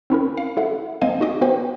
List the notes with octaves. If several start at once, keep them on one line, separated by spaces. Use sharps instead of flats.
C4 C#4 E4 A#4
F5
E4 A4 E5 F#5
A#3 C4 D4 D#5 F5 G#5
D#4 F#4 G#4 D#5 D6
B3 F#4 B4 C5 G5